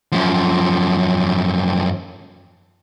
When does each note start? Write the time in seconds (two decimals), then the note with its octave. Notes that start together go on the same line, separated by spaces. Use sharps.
0.12 F#2 F3